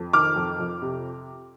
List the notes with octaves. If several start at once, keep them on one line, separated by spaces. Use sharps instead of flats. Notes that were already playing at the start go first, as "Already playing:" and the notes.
Already playing: F2
D#3 D6 F6
F2
F2
C3